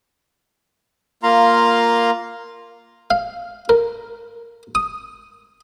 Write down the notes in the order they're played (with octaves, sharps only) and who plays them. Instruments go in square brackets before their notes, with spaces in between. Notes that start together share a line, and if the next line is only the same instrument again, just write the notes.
[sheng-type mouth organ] A#3 F4 F5 A#5 C6
[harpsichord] F5
A#4
D#6